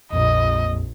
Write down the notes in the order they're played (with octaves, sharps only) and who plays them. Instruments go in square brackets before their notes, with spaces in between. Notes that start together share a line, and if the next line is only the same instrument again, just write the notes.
[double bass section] A#1 [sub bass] F2 [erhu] D#5